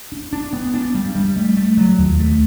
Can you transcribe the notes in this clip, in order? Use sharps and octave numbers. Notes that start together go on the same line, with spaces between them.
D4
D4
B3
D4
G3
G3
A3
A3
F#3
D#2
A3